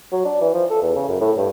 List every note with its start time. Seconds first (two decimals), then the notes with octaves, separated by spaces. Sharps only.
0.12 F#3
0.25 D4
0.41 E3
0.54 F3
0.70 A4
0.83 E2
0.95 C#3
1.09 F#2
1.21 A2
1.37 G2